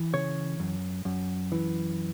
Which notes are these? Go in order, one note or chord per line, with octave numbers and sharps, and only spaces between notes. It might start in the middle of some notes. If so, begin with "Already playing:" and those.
Already playing: E3
C#3 C#5
F#2
F#2
E3